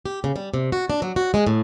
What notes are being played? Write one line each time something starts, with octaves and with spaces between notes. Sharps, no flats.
G4
C#3
G3
C3
F#4
D4
F#3
F#4
G#3
A2